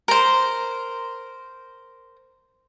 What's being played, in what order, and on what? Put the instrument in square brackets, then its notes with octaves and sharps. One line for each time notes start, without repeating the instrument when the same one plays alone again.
[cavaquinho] A#4 C5